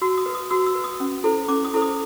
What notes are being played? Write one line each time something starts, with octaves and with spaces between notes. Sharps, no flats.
F#4 E6
D#6
B4
D#6
F#4 E6
E6
B4
D#6
C#4
E4 A4 C5
C#4 D6
D#6
E4 A4 C5
D#6